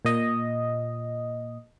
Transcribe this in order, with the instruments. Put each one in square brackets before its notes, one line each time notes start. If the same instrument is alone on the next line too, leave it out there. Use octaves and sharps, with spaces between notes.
[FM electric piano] A#2 D#5